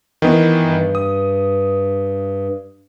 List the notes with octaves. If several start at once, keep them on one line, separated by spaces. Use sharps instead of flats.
D#3 E3 B3
G2
D#6